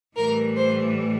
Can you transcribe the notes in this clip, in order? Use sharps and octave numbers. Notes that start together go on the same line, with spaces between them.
A2 E3 G3 A#4
C5